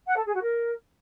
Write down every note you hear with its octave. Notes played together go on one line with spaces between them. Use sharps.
F#5
A4
G#4
F#4
A#4